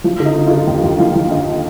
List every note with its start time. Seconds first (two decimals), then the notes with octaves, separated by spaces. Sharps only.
0.04 F3 F4
0.20 D3
0.25 D#4
0.36 D3
0.46 D3 F4
0.67 D#2 G4
0.84 D#2
0.99 F3 F5
1.15 F3
1.31 D3 D#5